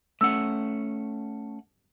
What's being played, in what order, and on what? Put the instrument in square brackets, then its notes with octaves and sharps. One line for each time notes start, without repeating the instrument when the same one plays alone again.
[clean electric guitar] A3 C#4 F#5 [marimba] E6